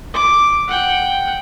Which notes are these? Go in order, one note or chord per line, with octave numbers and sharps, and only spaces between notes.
D6
F#5 G5